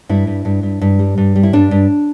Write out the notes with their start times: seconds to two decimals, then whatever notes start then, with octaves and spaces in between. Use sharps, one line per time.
0.09 G2 E4
0.27 G2
0.45 G2
0.63 G2
0.81 G2
0.99 G3
1.18 G2
1.36 G3
1.43 E4
1.53 G2 D4
1.71 G2